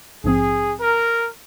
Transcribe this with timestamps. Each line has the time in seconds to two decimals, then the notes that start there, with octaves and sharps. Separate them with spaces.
0.24 A#1 G#2 F3 C4 G#4
0.79 A#4